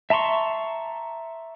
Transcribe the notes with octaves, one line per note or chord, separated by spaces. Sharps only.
E5 A5 A#5 C6 C#6